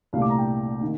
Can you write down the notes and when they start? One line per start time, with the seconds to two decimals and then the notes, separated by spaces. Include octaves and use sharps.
0.13 C2 A#2 A3 F5
0.22 D6
0.30 A#5
0.38 G5
0.81 D#3 A#3